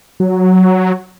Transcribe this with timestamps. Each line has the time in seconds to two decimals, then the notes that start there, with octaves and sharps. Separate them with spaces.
0.20 F#3